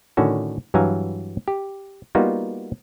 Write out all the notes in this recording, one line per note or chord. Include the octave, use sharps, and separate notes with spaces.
A2 D3 D#3 C#4 F#4
G2 E3 F#3 F5 G#5 A#5
G4
G3 A#3 B3 D#4 F4 F#4